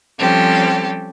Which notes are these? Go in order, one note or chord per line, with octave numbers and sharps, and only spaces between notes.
F3 G3 C4 C#4 G4 A4